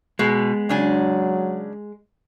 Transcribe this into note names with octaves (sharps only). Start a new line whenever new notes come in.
B2 G#3
C#3 F#3 D4 G#5